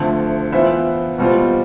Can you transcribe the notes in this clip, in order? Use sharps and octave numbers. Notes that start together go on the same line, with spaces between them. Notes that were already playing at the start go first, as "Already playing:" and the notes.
Already playing: D2 D3 F3 A3 C4
E3 B3 F4 C5 E5
B2 G3 C4 F4 C5